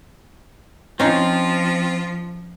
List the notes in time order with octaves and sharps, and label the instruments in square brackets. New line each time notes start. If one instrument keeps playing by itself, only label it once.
[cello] F3 [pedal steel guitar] C4 [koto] C#4 D#4 [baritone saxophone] F4